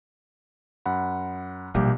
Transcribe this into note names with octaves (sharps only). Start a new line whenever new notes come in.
F#2 F#5 B5
A#1 B2 G3 A#3 G4